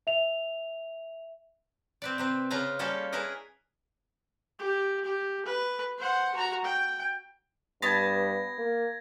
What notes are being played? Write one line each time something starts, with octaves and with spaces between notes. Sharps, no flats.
E5 F7
C4 B4 D5
C3 C4 B4
C#3 F3 F4 B4 F5 A#5
G3 A#3 C#4 A4 F5
E4 G#4 A#4 B4 D#5
G4
G4
B4
C5 F#5
F#4 A#5
G5
G2 B3 A5 G#6 A#6
A#3